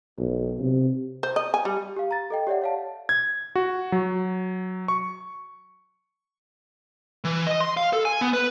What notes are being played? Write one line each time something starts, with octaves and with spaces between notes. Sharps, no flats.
B1
C3
C5
D#5
G#5
G3
G4 F5
A#5 A6
A4 D#5 G5
G4 C#5 D5 E5 F#5
C#5 F5 A5
G#6
F#4
F#3
C#6
E3
D#5
C6
F5
A4
G#5
B3
B4